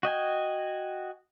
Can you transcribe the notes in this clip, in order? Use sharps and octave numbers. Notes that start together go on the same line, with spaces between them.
F#4 D#5 G5 G#5